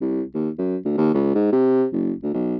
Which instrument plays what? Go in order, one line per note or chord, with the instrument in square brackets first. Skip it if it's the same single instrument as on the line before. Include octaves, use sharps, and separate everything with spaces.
[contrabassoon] C2
D#2
F#2
D2
D#2
C#2
G#2
C3
F#1
D2
B1